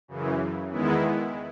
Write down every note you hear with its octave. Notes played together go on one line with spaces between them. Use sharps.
F#2 C#3 E3
E2 D#3 G#3 B3 E4